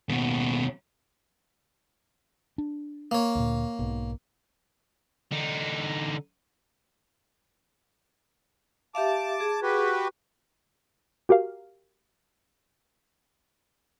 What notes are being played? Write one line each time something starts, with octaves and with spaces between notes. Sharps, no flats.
D#2 B2
D4
A#3 C#5
D2 A#2
B1 G#2 B2
D3 D#4
G4 E5 F5 A5 D6
G#4
F#4 G4 B4
F#4 G4 A#4 F5